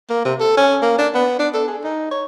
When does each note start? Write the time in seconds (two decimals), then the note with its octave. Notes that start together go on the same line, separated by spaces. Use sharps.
0.10 A#3
0.25 C3
0.40 A4
0.57 C#4
0.82 A#3
0.98 D4
1.14 B3
1.39 D4
1.54 A4
1.68 G#4
1.84 D#4
2.11 C#5